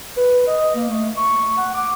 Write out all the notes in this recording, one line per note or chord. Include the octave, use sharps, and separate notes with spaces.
B4
D#5
A#3
A3
C#6
F#5
D6